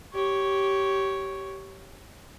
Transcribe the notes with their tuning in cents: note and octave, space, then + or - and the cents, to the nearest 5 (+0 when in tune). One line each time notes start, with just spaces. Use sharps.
G4 -15 C#5 +0